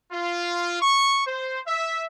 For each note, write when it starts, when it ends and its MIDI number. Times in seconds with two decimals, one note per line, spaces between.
0.12 0.80 65
0.81 1.25 85
1.26 1.60 72
1.67 2.05 76